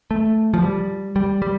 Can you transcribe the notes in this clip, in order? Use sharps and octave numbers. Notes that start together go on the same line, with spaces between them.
A3
F3
G3
G3
G3